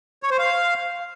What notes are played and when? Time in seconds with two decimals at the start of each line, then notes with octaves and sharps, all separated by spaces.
0.23 C#5
0.31 C5
0.39 F5